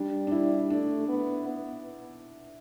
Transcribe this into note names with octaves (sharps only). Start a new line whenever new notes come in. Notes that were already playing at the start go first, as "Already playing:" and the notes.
Already playing: G3 D4
D4
E4
A3 D4
B3
B3